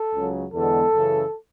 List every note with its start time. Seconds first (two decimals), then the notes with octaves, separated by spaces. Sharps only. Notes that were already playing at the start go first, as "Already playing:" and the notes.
Already playing: A4
0.14 C#2 C#3 F#3
0.53 E2 D3 G#3 B3 A4
0.92 F#2 C#3 E3